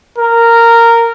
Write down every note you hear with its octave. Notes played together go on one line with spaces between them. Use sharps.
A#4